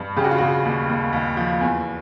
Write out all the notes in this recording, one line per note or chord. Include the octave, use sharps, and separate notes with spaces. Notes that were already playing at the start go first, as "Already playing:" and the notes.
Already playing: G2
C#3 G4
F#4
F4
C#3 F#4
D#2
D#2
D#2
F3
E2